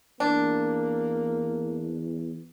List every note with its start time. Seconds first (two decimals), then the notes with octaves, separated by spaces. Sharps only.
0.20 E2 A#3 D4